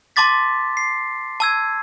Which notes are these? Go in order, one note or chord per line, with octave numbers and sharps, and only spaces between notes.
A5 C6 D6 A6 B6
C7
A5 E6 G#6